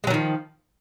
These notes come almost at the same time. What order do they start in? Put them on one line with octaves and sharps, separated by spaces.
G#3 F#3 D#3 F3